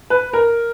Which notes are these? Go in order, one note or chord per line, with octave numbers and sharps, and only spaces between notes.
B4
A#4